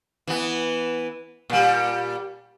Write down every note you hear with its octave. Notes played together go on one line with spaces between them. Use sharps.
E3 B3
A#2 G3